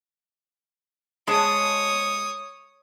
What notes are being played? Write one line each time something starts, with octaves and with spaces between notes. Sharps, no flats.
G#3 G#4 C#5 A5 D#6